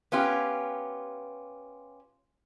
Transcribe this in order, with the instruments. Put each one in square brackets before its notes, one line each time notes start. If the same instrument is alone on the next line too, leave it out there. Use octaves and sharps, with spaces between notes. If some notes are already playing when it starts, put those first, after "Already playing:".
[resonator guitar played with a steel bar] B3 C#4 F4 G4